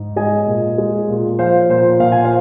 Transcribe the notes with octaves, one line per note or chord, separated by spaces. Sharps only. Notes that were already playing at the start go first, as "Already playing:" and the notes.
Already playing: G#2
G#3 D#5 G#5
A#2
G#3
A#2
F3 C5 F5
A#2 C5
A#2 F5
G#5
C5 F5